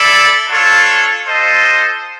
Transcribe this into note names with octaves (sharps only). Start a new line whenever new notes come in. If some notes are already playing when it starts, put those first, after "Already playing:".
Already playing: E4 A4 D5
D4 F4 A4 C#5
F4 A4 C5 D#5